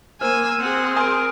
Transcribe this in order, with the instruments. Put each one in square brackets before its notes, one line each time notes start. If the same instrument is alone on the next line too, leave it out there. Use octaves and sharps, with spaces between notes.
[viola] A#3 [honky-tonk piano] C5 [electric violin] G#5 E6 [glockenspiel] F6 D#7
[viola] C4 G#4 [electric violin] F#5
[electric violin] A#4 [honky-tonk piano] G#5 C6 [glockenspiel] D#6 F6 D7